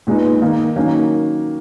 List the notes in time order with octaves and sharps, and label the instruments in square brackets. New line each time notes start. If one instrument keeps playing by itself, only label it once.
[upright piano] A#2 G#3 B3 D#4
D#3 A#3 D#4
D#3 F#3 A#3 C#4